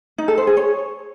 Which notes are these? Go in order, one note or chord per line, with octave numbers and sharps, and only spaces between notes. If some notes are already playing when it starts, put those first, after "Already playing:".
D#4
A4
C5
G#4
C#5